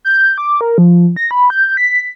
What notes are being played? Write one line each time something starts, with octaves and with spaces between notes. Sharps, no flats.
G6
D6
A#4
F3
A#6
B5
G6
B6